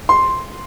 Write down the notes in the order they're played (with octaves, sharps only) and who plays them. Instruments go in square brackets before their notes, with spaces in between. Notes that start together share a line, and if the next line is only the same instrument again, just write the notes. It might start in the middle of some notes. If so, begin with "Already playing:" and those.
[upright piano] C6